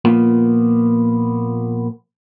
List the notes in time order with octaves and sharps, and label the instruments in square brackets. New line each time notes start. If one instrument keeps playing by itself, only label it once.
[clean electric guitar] A#2 F3 A#3 B3